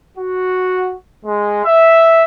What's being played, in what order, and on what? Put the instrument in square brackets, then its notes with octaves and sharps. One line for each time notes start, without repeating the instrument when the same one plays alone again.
[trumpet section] F#4
G#3
E5